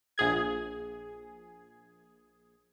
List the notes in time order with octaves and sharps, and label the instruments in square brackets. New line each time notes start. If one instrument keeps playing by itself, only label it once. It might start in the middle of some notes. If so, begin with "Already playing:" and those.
[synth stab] A#1 G#4 G#6